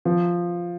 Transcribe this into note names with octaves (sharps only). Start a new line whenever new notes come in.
F3